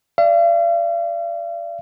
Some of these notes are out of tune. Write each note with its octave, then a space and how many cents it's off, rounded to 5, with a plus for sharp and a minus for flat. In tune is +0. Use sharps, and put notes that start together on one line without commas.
D5 +0 F5 -45